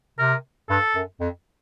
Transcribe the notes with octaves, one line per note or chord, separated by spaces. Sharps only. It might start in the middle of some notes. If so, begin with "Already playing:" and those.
C3 A#4
G2 A4
F#2
F2